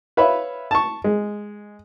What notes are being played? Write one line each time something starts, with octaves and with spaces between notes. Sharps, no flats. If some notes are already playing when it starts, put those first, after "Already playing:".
B4 C#5 E5 F5 B5
A5 C#6
G#3